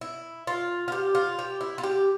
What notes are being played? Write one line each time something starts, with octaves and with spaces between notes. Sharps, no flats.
E4
F4
F4
G4
F4
G4
E4
F4
G4